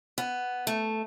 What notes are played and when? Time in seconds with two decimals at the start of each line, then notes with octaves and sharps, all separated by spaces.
0.18 B3
0.67 A3